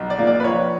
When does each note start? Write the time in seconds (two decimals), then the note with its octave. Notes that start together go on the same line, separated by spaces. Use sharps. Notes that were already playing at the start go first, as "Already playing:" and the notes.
Already playing: B1
0.10 D5
0.19 A#2 A#3
0.27 D5
0.40 B4
0.44 A#1 C#5